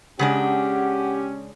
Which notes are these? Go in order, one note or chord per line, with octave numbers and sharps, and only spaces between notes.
C#3 G#3 C#4 D4 G4 F#5